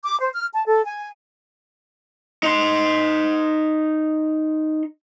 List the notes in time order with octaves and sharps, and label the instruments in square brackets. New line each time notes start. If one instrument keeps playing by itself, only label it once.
[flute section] D6
C5
F6
A5
A4
G#5
[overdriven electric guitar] D#4 C6